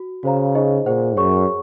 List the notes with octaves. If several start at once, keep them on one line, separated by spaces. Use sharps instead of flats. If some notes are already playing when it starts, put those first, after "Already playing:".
Already playing: F#4
C#3 F#4 C5 F5 A#5
D#4 G#4 C5 D#5
A#2 G#4 C5 F#5
F#2 G#4 C#5 F#5 C#6